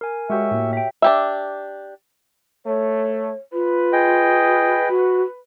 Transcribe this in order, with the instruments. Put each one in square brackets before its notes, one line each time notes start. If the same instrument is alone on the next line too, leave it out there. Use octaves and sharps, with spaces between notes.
[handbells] A#4 G#5
[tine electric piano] G#3 [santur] F#4 G4 C#5 [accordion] E5
[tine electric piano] A2 A#3 [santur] G4
[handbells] E5 G5
[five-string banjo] D4 G4 E5
[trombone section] A3 [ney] C#5
[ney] F4 [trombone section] B4
[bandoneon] G#4 D#5 G5
[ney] F#4